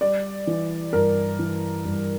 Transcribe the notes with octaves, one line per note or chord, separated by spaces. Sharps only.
G3 D5
E3
G2 A#4
E3
G2